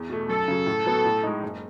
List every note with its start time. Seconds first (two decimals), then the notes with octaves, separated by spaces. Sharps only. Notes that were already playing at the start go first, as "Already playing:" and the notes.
Already playing: E2
0.10 B2 A3
0.29 F#2 A4
0.48 C#3 F#3
0.66 A2
0.85 F#3 B3
1.05 A2
1.23 G#3 D#4
1.43 F#1